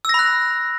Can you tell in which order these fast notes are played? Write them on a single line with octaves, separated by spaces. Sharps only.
E6 A#6 B5 F#6